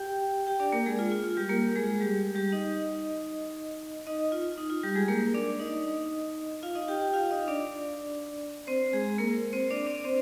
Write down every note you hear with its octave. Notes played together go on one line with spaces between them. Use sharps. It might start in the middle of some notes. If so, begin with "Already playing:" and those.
Already playing: G4 G5
G4 G5
D4 D5
A#3 A#4
G#3 G#4
F4
F4
F4
G3 G4
A#3 A#4
G#3 G#4
G3 G4
G3 G4
D#4 D#5
D#4 D#5
F4
D#4
F4
G3 G4
G#3 G#4
A#3 A#4
D4 D5
D#4 D#5
F4 F5
D#4 D#5
G4 G5
G4 G5
F4 F5
D#4 D#5
D4 D5
C4 C5
G#3 G#4
A#3 A#4
C4 C5
D4 D5
D4 D5
C4 C5